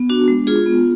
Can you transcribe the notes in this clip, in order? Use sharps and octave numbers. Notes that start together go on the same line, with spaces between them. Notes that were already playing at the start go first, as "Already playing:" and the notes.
Already playing: B3
D4 F#4
G#3
F4 G#4
B3